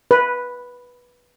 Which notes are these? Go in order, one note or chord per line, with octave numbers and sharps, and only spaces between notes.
B4